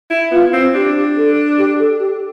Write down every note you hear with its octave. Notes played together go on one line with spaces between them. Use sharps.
E4
B3 F4
C4
D4 G4
A4
G4
A4
G4